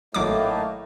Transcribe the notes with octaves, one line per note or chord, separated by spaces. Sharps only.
G#1 A2 F#3 A3 A#3 D#4 D6